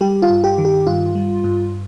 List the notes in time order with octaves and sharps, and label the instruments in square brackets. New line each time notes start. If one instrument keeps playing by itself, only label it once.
[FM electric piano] G3 G4
F4
G2
G4
D#3
G4
G2 F4
G3
G2